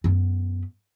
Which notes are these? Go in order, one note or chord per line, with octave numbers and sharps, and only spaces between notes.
F#2 B3